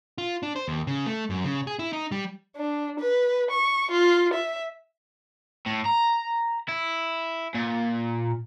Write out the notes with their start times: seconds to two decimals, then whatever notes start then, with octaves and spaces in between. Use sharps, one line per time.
0.18 F4
0.43 D4
0.56 C5
0.68 D#2
0.87 C#3
1.06 A3
1.30 F#2
1.44 C#3
1.67 G#4
1.79 E4
1.93 D#4
2.12 G3
2.56 D4
3.00 B4
3.51 C#6
3.91 F4
4.33 E5
5.66 A2
5.85 A#5
6.68 E4
7.55 A#2